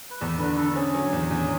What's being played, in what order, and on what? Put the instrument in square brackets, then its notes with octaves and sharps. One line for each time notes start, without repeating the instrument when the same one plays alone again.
[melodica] B4
[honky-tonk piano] E2 [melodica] A4
[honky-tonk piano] D3 [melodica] B4
[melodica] B4
[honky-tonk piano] D3 [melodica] A4
[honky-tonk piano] C#4 [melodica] G#4
[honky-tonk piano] F#3
E2
E2